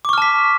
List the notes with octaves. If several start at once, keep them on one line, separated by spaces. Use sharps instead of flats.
A5 C#6 D6 F6 B6